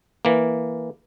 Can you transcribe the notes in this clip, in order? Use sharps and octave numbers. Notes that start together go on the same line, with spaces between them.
E3 A#3